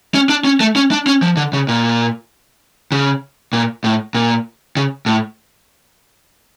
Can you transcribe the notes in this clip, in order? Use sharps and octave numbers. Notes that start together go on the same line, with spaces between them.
C#4
D4
C#4
A3
C#4
D4
C#4
F3
D3
C#3
A#2
C#3
A#2
A2
A#2
C#3
A2